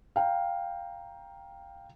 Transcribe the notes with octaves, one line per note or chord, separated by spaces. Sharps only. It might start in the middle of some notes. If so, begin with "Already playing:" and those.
F5 G5 A#5